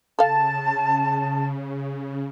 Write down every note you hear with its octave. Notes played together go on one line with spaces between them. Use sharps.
C#3 A4 F5 A5